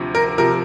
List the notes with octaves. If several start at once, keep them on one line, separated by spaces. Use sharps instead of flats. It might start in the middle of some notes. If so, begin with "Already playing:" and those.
Already playing: D2 C3 F3
A#4
C3 F3 A#4